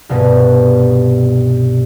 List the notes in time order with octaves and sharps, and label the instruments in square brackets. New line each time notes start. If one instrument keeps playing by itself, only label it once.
[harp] C2 G2 B2